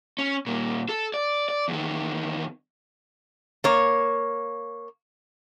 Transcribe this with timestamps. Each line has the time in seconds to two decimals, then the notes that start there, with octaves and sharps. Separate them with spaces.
0.19 C#4
0.47 A#2 G3
0.89 A4
1.14 D5
1.49 D5
1.68 E2 D#3
3.64 A#3 C#5